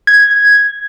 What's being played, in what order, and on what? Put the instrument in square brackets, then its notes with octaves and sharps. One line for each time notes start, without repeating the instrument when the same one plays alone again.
[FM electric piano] G#6